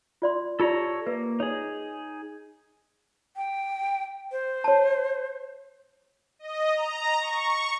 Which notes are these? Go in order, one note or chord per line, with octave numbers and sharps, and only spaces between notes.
F4 D5 C6
F4 G4 A4 C#5 D5 A#5
A#3 B4
D#4 G#4 C#5
G5
C5
C#5 A5
D#5
A#5
C#6